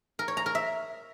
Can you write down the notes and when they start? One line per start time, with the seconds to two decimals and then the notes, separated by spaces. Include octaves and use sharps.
0.19 A#4
0.28 C#5
0.37 A#5
0.46 A#4
0.55 E5